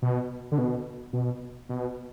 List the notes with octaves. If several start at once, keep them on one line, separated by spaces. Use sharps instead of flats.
B2
D3
B2
B2
B2